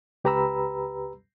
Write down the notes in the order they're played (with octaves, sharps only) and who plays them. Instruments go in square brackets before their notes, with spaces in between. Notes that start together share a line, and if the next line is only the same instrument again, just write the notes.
[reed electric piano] C#2 G4 B4 A#5 B5 E6